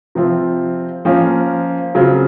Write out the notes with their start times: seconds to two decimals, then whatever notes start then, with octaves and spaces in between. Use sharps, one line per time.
0.15 C3 F3 C4 F4
1.05 F3 A#3 C#4 F4
1.95 C#3 F#3 C4 F4